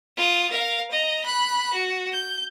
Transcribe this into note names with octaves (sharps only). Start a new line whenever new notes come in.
F4 D#6
A#4 F5
D#5 A#5
B5 F#6
F#4
G6